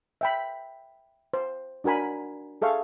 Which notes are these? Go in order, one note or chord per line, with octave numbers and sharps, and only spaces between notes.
E5 G5 B5
C5
D4 F#4 A#4 G#5 B5
G#4 A4 E5 F5 C#6